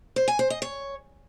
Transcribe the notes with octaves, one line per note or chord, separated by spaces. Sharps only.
C5
G#5
C5
D#5
C#5